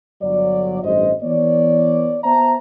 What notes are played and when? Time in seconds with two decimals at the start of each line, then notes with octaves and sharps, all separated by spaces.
0.22 G1 F#3 D5
0.83 A1 G2 C5 D#5
1.23 E3 B3 C#5 D5
2.24 B3 C5 E5 A5 A#5